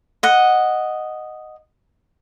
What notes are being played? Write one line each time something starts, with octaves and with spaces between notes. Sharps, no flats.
D#5 F#5